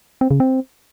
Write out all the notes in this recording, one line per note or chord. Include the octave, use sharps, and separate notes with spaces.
C4
C#3
C4